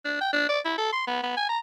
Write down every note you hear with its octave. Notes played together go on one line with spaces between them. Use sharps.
D4
G5
D4
D5
E4
A4
C6
B3
B3
G#5
A#5